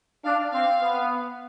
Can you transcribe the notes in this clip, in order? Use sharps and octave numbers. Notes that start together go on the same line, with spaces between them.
D4 F5
C4 F5
B3